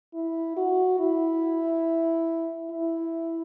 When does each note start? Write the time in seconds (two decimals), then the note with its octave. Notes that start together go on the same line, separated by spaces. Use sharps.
0.14 E4
0.57 F#4
1.00 E4
2.71 E4